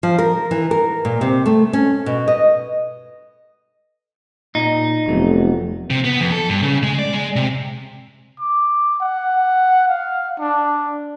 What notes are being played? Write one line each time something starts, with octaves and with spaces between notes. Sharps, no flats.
F3
A#4
E3
A#4
A#2
C3
A3
C#4
B2
D#5
A#2 D#4
F1 F#3 A3 B3
C3
B3
F2
A4
G2
C#3
G#3
D5
G#3
C3
D6
F#5
F5
D4